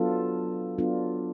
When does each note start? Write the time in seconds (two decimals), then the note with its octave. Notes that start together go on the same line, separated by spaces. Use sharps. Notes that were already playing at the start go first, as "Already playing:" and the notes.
Already playing: F#3 B3 D4 F4 A4
0.78 F#3 B3 D4 F4 A4